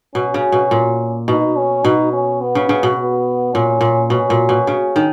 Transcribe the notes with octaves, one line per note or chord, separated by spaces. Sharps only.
B2 C#4
C#3
B2
A#2
B2 D#4
C#4
B2 D#4
C#4
B3
C#3
C#3
B2
B3
A#2 C#4
A#2
B2 C#4
A#2
B2
C#3
D#3